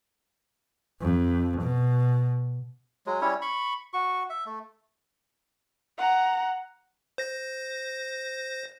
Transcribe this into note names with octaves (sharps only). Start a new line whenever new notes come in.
F2
B2
F#3 G#3
G3 C#4 E4 C#5
B5 C#6
F#4 C#6
E5
A3
F#5 A#5
C5 A#6